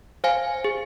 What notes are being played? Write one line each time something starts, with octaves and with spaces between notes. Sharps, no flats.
C5 F5 G#5
G#4